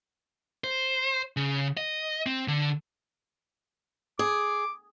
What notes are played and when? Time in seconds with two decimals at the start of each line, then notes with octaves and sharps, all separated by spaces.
0.64 C5
1.37 C#3
1.77 D#5
2.26 C4
2.48 D3
4.19 G#4 D6